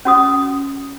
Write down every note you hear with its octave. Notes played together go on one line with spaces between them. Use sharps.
C#4 F#4 D#6